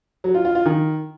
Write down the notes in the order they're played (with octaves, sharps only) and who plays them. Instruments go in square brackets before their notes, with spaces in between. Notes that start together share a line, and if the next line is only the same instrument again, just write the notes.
[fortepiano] F#3
F4
F4
F4
D#3